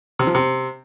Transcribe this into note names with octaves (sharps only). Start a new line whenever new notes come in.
C3
F3
C3